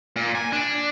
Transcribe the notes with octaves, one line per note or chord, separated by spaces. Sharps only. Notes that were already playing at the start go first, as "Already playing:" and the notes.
A#2
G#5
D4